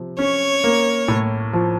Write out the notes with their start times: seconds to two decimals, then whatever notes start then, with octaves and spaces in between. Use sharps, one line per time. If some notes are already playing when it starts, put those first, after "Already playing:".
Already playing: C3 F3
0.19 C#4 C#5
0.64 A#3
1.08 A2
1.53 F3